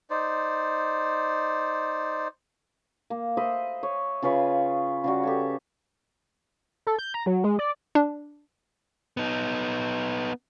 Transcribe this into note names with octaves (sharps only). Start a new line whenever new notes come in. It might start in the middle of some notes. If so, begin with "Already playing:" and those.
D#4 C5 D5
A#3
C5 D#5 E5 B5
C#5
C#3 F4 B4 C#5
C#3 G3 F#4
G4 A4 C#5
A4
G6
A#5
F#3
G#3
D5
D4
B3 D#4